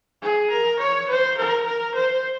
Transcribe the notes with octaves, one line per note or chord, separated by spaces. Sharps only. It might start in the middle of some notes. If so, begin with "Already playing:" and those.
G#4
A#4
C#5
C5
A#4
A#4
C5